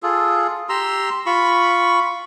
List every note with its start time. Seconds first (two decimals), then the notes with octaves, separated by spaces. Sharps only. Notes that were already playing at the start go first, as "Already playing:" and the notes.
0.03 F4 G#4 A4
0.69 G4 A#5 C6 E6
1.26 F4 B5 C#6